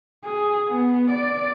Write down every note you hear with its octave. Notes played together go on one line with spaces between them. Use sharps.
G#4
B3
D5